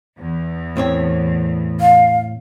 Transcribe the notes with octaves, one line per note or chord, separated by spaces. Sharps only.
E2
A2 C4 C#5
F5